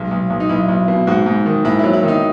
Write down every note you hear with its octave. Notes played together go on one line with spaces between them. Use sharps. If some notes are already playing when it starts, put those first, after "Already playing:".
Already playing: B1 G#3
B1
B1
D#4
B1 E4
B1
B2
G#2 F#4
G#2
D#3
G#2 E4
F#3 E4
E4
D#3
D#4